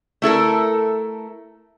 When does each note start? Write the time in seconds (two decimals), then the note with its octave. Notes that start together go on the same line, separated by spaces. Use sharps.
0.22 A3 E4 A4 A#4